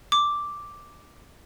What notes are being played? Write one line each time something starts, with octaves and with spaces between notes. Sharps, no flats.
D6